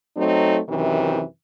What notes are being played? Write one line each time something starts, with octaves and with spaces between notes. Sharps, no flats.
F#3 A3 C4 D#4
F#2 C3 D#3 E3